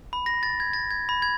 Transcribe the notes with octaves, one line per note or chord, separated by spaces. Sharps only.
B5
A#6
A6
G#6
A6
G#6
B5
G#6